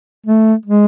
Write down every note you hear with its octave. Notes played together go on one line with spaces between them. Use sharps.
A3
G#3